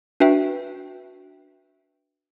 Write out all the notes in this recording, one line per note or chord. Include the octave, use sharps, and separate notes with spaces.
D4 F#4 B4 E5 G5